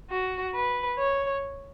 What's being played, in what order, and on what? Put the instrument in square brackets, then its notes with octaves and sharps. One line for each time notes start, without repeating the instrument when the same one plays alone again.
[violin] F#4
B4
C#5